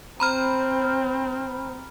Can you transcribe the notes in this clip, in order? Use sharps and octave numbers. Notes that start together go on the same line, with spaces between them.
C4 C5 A#5 B5 F6